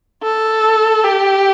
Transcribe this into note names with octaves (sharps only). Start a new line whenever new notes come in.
A4
G4